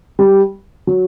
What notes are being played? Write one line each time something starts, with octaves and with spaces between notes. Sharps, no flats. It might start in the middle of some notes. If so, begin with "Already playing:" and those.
G3
F#3